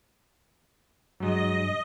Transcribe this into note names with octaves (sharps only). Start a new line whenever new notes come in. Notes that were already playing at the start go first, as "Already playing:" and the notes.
G2 F#3 G#3 D#5